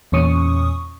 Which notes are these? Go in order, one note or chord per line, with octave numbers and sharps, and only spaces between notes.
E2 A#2 C#4 C#6 D#6